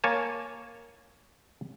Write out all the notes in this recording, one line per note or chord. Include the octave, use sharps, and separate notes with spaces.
A#3 C#5 G#5 A5